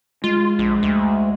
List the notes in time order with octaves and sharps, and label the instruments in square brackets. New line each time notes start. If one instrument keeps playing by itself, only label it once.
[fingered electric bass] G#3 [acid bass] F4
[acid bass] A#1
D2